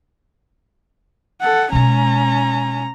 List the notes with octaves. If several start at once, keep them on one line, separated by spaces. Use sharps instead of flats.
A4 F#5
B2 G#3 C#4 A#5